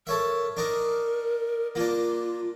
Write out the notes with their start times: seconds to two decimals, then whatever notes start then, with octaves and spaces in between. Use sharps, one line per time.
0.07 A4 A#4 C#5 E5
0.57 D4 D#4 A#4
1.75 A#3 D4 F4